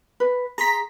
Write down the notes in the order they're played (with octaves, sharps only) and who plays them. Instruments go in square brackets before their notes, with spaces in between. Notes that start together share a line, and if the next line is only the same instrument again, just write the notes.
[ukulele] B4
[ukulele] G#4 [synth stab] A#5 C6 B6